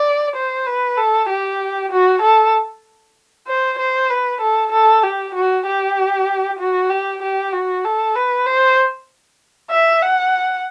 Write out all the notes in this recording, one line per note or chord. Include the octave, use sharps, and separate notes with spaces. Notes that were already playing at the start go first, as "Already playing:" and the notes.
Already playing: D5
C5
B4
A4
G4
F#4
A4
C5
C5
B4
A4
A4
G4
F#4
G4
F#4
G4
G4
F#4
A4
B4
C5
E5
F#5